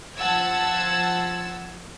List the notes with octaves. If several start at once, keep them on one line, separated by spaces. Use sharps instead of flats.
F3 F#5 A5 E6 G#6